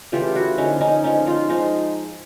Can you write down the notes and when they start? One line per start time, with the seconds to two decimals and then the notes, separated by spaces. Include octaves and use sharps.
0.12 C#3 E3 A3 F4 G4
0.35 E4 F#4
0.58 D3 F3 A#3 C#4 D#4
0.81 C#4 D#4
1.04 D3 F3 G#3 C#4 D#4
1.27 D#4 F4
1.49 F3 G#3 D#4 F4